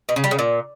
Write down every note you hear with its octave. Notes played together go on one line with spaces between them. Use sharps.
B2
C#3
G3
C#3
A#2